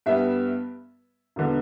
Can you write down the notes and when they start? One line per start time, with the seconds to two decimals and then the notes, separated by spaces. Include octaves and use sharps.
0.06 G2 G3 B3 E5
1.36 E1 D3 B3